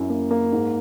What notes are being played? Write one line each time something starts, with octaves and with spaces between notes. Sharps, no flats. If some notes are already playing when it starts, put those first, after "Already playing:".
Already playing: F#2 E4
A#3
A#3
G#2